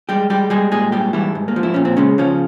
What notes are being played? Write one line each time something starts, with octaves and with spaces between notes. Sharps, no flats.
G3 G#3 G4
G3 G#3 G4
G3 G#3 G#4
A#2 G#3 G#4
G#2 G3 G4
E3 G3 E4
G#2
A#3
F3
E4
A#2 C#4
C4
C#3 G#3 C#4
C#3 F3 C#4